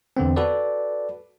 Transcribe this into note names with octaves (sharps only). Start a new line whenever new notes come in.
E2 D3 B3 C4
F#4 A4 B4 D5